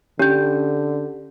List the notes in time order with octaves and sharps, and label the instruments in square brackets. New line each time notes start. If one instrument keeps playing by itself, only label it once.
[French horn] D3 [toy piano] C#4 [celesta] G4 G6